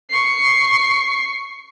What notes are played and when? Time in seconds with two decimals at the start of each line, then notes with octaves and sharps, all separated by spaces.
0.10 C#6 C7